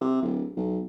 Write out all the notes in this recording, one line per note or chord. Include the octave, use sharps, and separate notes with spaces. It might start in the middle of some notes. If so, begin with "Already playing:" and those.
C3
D1
B1